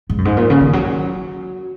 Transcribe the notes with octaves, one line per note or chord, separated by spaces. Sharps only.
G#2
F#2
G#2
A#2
C#3
D#3
F#3